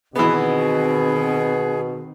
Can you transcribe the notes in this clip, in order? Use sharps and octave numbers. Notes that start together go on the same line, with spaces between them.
B2 D#3 E3 B3 C4 G#4